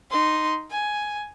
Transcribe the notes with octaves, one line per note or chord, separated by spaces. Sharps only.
D#4 C6
G#5